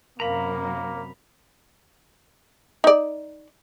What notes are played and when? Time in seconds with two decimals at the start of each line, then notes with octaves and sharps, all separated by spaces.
0.20 F#2 C3 A#3 A#4 F5 A#5 B5
2.84 D#4 D5